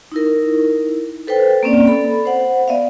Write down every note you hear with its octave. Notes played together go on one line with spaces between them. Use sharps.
D#4 E4 A#4
A4 B4 C5 G5
A#3 C4 C#4 D5
A4 B5
C5 F#5
B3 D5 E5 F5